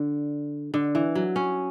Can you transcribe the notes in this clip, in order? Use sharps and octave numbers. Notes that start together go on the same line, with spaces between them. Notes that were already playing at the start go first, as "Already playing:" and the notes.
Already playing: D3
D3
E3
F#3
C#4